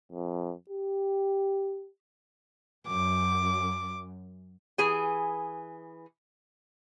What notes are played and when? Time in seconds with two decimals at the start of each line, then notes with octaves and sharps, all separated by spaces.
0.12 F2
0.70 G4
2.88 F#2 D6
4.78 E3 G#4 G#5